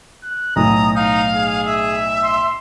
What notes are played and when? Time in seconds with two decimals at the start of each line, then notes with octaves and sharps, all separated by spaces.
0.23 F#6
0.56 B1 A2 F#4 A#5 D#6
0.95 D#4 F5
1.33 G#4
1.66 E5
2.24 C6